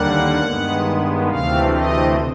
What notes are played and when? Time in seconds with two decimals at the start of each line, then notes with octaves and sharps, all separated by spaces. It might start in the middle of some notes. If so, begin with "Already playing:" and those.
Already playing: D#2 D3 G3 A#3 F#5
0.39 G2 D#3 G#3 B3
1.29 D2 C3 E3 A3 C4 F5
1.74 D#5